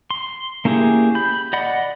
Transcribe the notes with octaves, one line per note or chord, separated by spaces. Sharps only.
C6
A#3 C#4 E4 G4 G#4
B5 G6
D5 D#5 F#5 B5